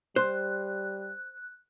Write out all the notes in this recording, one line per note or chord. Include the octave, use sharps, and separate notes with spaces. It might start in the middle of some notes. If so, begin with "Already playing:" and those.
G3 C5 F#6